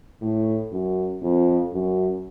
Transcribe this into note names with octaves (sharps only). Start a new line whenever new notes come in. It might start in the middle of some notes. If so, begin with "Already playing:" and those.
A2
F#2
F2
F#2